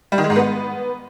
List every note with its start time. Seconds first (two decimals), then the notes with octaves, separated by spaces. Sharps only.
0.12 G3
0.18 D#3
0.24 G#3
0.30 G#2
0.36 B3